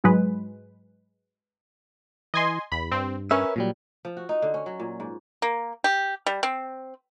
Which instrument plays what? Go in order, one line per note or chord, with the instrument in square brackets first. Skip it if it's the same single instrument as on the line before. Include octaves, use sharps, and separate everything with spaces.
[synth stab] G#2 F#3 G#3 B4
[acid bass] E3 [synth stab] D#5 G#5 C6
[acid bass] E2 [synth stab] B5
[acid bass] G2 [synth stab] C4
[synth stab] C#4 [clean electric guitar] A#4 B4 E5
[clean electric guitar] A#2 F#3 G3
[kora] F3
F#4
D#4
D3
C#4
F#3
A#2
G#2
[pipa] A#3
G4
G3
C4